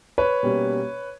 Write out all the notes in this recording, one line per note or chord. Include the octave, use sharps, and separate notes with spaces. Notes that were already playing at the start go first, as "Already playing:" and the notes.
B4 C#5
B2 G3 A#3 C#4